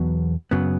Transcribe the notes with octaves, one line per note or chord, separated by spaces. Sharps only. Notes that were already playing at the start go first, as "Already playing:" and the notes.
Already playing: E2 B2 F#3 B3
F#2 C#3 F#3 B3